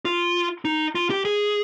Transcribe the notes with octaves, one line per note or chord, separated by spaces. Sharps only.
F4
D#4
F4
G4
G#4